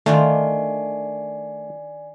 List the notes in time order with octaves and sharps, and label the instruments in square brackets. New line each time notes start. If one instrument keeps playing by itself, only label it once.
[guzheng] D#3 D4 F4 [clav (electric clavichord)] A3 [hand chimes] D5 G#5 C7